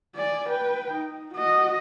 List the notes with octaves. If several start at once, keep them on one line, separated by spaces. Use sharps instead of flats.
D5 G#5
B4 G5
D#4
F#4 D#5